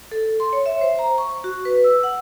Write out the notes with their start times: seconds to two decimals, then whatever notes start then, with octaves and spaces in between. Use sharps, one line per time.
0.11 A4
0.40 C6
0.53 C#5
0.66 E5
0.81 C5
0.99 A#5
1.18 C#6
1.44 F#4
1.65 B4
1.84 E6
2.03 F#5